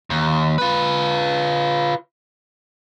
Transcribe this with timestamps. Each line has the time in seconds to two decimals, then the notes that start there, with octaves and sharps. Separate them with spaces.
0.10 D#2
0.58 F4 B4